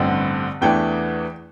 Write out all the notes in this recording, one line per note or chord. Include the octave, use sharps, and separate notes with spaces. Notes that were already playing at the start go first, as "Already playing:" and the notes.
Already playing: A1 G2 D3 C4
E2 E3 A3 D4 G5